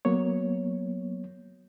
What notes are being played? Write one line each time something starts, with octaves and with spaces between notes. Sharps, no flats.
F#3 A#3 B3 C#5